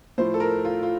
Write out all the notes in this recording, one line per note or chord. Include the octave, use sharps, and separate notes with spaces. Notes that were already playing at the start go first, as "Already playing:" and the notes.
A2 F3 C5
A4
A#4
F4
F4